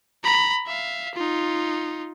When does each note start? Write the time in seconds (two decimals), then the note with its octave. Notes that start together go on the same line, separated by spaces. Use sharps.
0.24 A#5 B5
0.67 E5 F5
1.15 D#4 F4